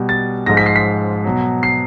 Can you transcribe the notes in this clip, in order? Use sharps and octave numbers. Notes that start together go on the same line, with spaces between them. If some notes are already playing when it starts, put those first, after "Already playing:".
Already playing: B2 G3
A6
G#2 F3 G#3 A#6
B6
C7
B6
B2 F#3
C7